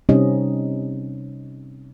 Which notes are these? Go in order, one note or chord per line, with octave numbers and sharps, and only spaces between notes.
C3 G3 C4 C#4 D#4 D#5